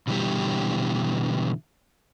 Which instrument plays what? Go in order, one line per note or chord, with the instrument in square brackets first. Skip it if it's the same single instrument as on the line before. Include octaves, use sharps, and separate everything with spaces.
[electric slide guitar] B2 D3 E3 G3 B3 G4